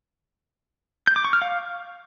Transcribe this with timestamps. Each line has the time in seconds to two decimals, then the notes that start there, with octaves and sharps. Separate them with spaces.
1.07 G6
1.16 D6
1.25 C#6
1.33 F6
1.42 F5